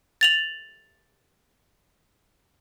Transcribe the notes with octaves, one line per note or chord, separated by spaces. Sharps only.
A6 F7 F#7